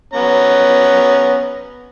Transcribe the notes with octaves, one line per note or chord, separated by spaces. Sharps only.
B3 C#4 A#5